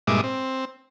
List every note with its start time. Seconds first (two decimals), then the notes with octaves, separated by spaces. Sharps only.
0.07 G2 A#2 G#3 E5 D6 D#6
0.24 C4